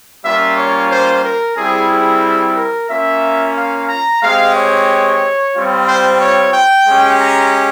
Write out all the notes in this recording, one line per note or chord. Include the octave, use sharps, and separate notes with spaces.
G3 A#3 C#4 F4 E5
C#5
C5
A#4
G3 C4 E4 G#4
G#4
A#4
A#3 C#4 F4 E5
F5
A#5
G#3 C4 G4 F5
C#5
G3 C4 F4
C5
C#5
G5
G#3 C#4 G4
A#5